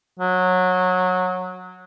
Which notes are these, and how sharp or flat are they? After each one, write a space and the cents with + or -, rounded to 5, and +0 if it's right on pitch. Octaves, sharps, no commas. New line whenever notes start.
F#3 -20